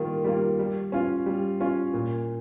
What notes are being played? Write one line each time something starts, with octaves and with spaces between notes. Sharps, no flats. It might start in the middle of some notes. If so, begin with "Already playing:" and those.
Already playing: D#3 G3 A#3 F4
G3 A#3 F4
G3
C#4 F4
G3
C#4 F4
A#2